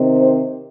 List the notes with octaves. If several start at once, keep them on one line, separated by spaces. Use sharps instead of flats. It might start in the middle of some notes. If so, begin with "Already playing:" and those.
Already playing: C3 D#3 C4
C5